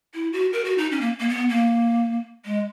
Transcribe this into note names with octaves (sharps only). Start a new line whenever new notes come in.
E4
F#4
A#4
F#4
D#4
C#4
A#3
A#3
B3
A#3
G#3